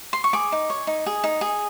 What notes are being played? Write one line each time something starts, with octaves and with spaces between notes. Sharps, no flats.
C6
C#6
G#4 D6
D#4
C#5
D#4
G#4
D#4
G#4